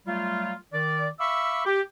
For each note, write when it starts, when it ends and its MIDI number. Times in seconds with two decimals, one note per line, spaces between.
0.07 0.54 54
0.07 0.54 55
0.07 0.54 57
0.07 0.54 65
0.72 1.08 51
0.72 1.08 74
1.19 1.63 76
1.19 1.63 77
1.19 1.63 83
1.19 1.63 85
1.19 1.63 86
1.19 1.63 88
1.66 1.81 67